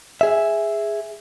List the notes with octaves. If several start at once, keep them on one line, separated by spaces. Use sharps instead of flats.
G#4 E5